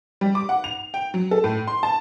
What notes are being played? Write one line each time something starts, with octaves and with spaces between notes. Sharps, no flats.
G3
D6
F#5
F7
G5
F#3
A4
A2
C6
A5